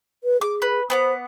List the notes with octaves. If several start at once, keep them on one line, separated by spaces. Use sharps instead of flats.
B4
G#4 D6
B4
B3 C5 F#5 D6